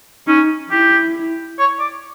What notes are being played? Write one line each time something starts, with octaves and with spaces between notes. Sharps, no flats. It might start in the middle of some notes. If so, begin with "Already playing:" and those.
C#4 D#4
E4 G4
C#5
D5